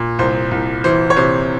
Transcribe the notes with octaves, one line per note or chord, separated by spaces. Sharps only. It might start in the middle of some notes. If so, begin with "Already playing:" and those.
Already playing: A#2
C2 C5
C2
E3 C5
C#5
C3 C5